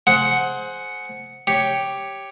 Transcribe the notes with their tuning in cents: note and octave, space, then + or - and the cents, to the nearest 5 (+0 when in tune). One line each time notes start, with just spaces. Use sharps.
G#4 +20 C5 +0 F#5 +0
G4 +0 C#5 +0